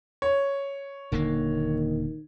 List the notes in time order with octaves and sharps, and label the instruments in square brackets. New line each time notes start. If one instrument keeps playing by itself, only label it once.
[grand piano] C#5
[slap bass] D#1 D3 A#3 [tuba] D#3